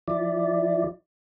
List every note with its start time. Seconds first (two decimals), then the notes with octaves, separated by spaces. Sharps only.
0.08 F3 E4 D5